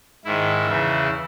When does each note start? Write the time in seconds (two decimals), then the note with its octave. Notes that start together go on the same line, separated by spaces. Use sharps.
0.25 G#2 D#3 E4
0.66 E2 C#3 E3